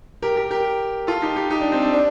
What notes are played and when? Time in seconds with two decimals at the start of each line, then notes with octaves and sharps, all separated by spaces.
0.22 G4 A#4
0.36 G4 A#4
0.51 G4 A#4
1.07 F4 A4
1.22 D#4 G4
1.36 D#4 G4
1.50 D#4 G4
1.61 D4
1.72 C4
1.82 D4
1.93 D4